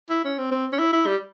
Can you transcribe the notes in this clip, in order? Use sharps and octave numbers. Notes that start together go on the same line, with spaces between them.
E4
C#4
C4
C4
C#4
E4
E4
G3